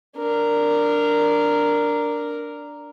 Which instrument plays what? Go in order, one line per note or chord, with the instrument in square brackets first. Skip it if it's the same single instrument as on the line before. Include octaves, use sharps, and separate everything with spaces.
[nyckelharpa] D4 A#4